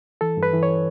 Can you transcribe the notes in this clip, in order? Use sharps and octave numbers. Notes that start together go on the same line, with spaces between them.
E3 A4
G2
B4
E3
C#5